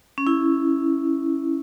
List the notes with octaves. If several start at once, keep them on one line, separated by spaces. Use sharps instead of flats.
C#4
E4